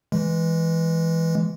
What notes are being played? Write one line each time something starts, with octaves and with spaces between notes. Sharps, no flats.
E3 G#3